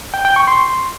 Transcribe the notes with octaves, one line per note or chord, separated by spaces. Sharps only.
G5
G5
C#6
C6